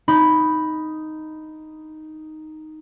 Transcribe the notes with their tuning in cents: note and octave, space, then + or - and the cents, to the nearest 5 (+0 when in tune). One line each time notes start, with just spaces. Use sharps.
D#4 +0 B5 +0